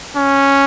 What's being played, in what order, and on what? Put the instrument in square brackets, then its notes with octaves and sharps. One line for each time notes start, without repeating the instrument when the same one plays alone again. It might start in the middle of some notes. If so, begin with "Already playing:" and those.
[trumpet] C#4